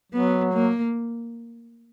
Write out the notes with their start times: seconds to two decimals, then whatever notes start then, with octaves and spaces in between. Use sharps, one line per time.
0.12 F#3 B3
0.54 A#3